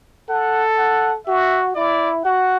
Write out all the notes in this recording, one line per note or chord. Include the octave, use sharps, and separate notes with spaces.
A4 F#5
F#5
F#4 E5
E4 D5
F#4 F#5